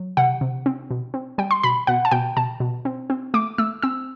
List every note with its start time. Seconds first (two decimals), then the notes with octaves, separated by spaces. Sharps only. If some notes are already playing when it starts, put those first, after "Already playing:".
Already playing: F#3
0.17 C3 F#5
0.41 C3
0.66 C4
0.90 B2
1.14 C4
1.38 G3 G5
1.51 C6
1.63 B2 B5
1.87 B2 F#5
2.05 A5
2.11 B2 G5
2.37 B2 A5
2.60 B2
2.85 C4
3.10 C4
3.34 A3 D6
3.58 A3 E6
3.82 C4 E6